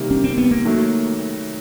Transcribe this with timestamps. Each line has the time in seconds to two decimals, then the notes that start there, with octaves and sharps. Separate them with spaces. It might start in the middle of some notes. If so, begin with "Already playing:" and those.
Already playing: C3 D#3 G3 A#3
0.11 C#4
0.24 C4
0.38 B3
0.51 A#3
0.65 D#3 F#3 A3